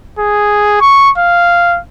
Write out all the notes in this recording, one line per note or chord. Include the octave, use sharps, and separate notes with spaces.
G#4
C#6
F5